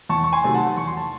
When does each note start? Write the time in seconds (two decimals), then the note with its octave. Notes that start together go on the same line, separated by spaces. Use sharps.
0.09 E2 A5 C#6
0.24 C#6
0.33 G#5 C6
0.44 C3 D#3 F#3 A3
0.54 F#5 A5
0.77 E2 C#6
0.87 C6
0.97 A5